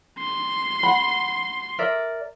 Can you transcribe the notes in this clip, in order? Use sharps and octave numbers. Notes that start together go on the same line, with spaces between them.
C6
F#5 B5
A#4 D5 E5